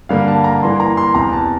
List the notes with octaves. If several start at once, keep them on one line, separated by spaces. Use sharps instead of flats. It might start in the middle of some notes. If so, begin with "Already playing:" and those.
G2 D3 G3 A#3 F5
A5
A#5
G2 E3 A#3 C6
A#5
C6
E2 C3 E3 A#5
A5